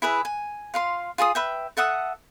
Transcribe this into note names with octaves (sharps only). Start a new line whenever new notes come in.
E4 G#4 B4 E5
G#5
F4 F5 C6
F4 G#4 A5 D#6
B4 E5 G5
A4 E5 F#5 D#6